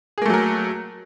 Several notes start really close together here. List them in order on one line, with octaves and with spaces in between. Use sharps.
G#4 A#3 A3 F#3 A#4